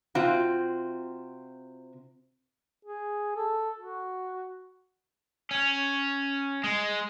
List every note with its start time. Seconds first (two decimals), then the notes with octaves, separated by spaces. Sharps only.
0.15 C3 C4 F4 F#4
2.85 G#4
3.36 A4
3.78 F#4
5.51 C#4
6.64 G#3